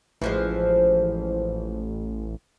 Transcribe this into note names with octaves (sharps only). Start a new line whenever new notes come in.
A1 E3 F3 G#3